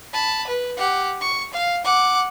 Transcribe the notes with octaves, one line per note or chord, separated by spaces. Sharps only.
A5 B5
B4
G4 F#5
C#6
F5
F#5 D6